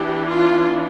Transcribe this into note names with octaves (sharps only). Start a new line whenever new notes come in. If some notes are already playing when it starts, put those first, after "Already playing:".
Already playing: E3 B3 D4 G4
F4